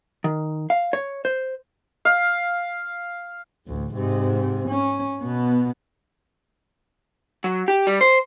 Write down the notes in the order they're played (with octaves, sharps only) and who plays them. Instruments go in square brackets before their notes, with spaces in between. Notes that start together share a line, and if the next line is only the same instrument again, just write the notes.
[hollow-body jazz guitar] D#3
F5
C#5
C5
[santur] F5
[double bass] A1 D2
G#2 C3
C#4
B2 B3
[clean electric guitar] F#3
G4
G3
C5